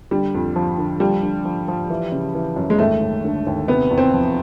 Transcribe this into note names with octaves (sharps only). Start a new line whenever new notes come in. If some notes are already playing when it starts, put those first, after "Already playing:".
D3 G3
F2
F3
D3
F3 G3
D3
F3
F3
E3
C#3
E3
F#2
G#3
D#2 A3
D#2
D3
D#2
C3 B3
E2
C4
F3